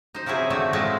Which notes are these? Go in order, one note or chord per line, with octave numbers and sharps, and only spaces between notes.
D#4 C5
C3 F3 F#3 E4 G#4
D3 D#3 A3 C4 F#4 C5
A2 F3 G#3 C4 E4 F4